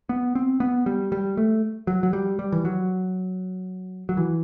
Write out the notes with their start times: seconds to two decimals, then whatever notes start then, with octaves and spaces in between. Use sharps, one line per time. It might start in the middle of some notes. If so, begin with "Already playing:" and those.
0.09 B3
0.35 C4
0.60 B3
0.86 G3
1.12 G3
1.37 A3
1.87 F#3
2.03 F#3
2.13 G3
2.39 G3
2.52 E3
2.65 F#3
4.09 F#3
4.17 E3